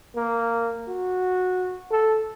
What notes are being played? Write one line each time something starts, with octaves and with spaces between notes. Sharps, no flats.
A#3
F#4
A4